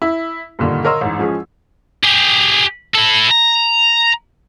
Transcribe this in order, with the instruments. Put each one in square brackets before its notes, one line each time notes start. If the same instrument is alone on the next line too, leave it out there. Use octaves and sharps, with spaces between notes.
[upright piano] E4
G2 A#2 D3 D#3
A#4 C#5 D#5 C6 E6
A1 G#2
F3 G#3 C#4 G#4
[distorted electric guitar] G4 G#4
E4 A4
A#5